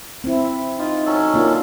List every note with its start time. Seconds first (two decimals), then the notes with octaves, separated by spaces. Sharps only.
0.24 C4 E4
0.79 D#4 F4
1.06 F#3 C#4 A4
1.34 A#3 D4 F4